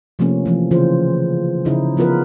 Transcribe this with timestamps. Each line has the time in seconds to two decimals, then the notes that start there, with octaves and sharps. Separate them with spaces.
0.19 C3 F3 A3 A#3 C#4
0.46 E3 F3 A3
0.71 C#3 E3 F4 C5
1.65 C#3 D#4 E4
1.97 F3 B3 F4 A#4 B4